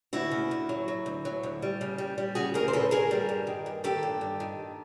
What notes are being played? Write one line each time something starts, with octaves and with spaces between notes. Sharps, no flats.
D2 E4 F#4
C#3
D2
F#3
F#3
D2
F#3
D2
G3
C#3
G3
G3
C#3 F#4 G#4
D2 G#4 A#4
C5
C#3 A4 B4
D2 G#4 A#4
G3
G2
D#3
G2
D#3 G4 A4
G2
G2
D#3